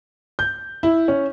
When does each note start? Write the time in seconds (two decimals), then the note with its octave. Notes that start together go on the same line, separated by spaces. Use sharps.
0.39 G6
0.83 E4
1.08 C#4